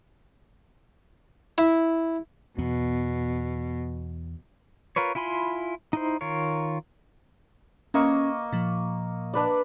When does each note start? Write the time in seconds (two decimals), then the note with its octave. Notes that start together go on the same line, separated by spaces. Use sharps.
1.58 E4
2.58 E2 B2 B3
4.96 F4 A#4 B4 C#5
5.15 E4 F4 G#5 B5 C6
5.93 D#4 E4 C5
6.21 D#3 F4 A#4 C#5
7.94 A#3 C#4 D#5 C#6
8.53 A#2 F3
9.33 D4 B4 D5